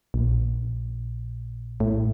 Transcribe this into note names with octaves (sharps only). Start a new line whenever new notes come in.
A#1
A2